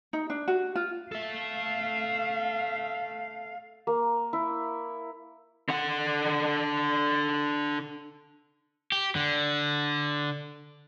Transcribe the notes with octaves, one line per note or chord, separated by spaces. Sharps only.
D#4
D4
F#4
F4
A4 E5 F5
A#3
E4
D3 F#5
G4
D3